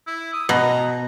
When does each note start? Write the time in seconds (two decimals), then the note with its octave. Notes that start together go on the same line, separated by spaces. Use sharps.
0.07 E4
0.34 D#6
0.49 B2 A#5